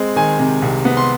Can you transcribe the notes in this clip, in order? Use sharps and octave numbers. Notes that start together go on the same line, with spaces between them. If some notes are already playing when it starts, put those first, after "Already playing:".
Already playing: G#3 C4
D#3 G#5
C3
C2
B3
C6